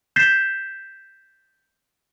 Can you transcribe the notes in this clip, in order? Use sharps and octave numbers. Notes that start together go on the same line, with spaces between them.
G6 A6 B6 C7 E7 G7